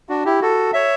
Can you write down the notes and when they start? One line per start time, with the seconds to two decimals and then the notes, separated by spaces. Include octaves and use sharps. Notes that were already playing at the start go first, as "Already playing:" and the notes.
0.09 D4 F#4
0.25 E4 G4
0.42 F#4 A4
0.73 C#5 E5